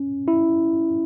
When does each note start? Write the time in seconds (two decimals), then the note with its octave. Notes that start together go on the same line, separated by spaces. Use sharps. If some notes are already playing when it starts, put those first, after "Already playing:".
Already playing: C#4
0.28 E4